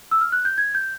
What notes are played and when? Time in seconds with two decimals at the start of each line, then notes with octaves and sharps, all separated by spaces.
0.11 E6
0.21 F6
0.32 F#6
0.45 G6
0.58 G#6
0.75 G6